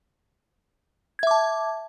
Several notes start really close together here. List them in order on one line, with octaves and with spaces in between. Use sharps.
G#6 E5 D6 A5